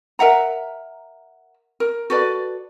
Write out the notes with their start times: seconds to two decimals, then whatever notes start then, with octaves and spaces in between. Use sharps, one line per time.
0.19 A#4 E5 F#5 A#5
1.80 A#4
2.10 F#4 A4 B4 D5